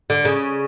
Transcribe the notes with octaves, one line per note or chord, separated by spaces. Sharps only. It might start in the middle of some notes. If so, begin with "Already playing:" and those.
D3
C#3